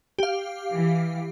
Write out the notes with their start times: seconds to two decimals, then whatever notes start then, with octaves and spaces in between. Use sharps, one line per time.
0.19 G4 F5
0.73 E3